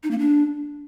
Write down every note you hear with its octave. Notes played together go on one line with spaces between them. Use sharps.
D#4
A#3
D4